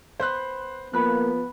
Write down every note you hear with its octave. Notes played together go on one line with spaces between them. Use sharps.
B3 B4 C5 C6 F#6
F3 A#3 B3 B5 F#6